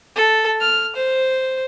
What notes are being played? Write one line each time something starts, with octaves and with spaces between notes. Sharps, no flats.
A4
F6
C5